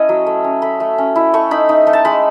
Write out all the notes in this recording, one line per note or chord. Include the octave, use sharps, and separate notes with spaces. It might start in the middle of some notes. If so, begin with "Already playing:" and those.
Already playing: C#4 E4 A4 C#5 D#5
F#3
A3
C#4
A3 B5
A3
C#4
E4
A3 C#6
D#4 B5
D#4
A3
A5
G#3 B5